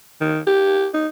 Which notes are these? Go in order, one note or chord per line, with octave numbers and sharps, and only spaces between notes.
D#3
G4
D#4